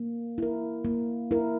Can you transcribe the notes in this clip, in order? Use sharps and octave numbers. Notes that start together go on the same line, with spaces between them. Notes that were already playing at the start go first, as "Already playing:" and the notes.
Already playing: A#3
E4 A#4
A#3
E4 A#4